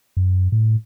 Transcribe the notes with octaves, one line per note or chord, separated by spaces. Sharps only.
F#2
A2